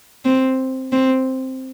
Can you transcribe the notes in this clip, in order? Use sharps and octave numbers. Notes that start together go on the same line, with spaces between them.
C4
C4